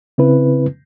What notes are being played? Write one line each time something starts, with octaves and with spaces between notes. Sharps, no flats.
C#3 C4 E4 B4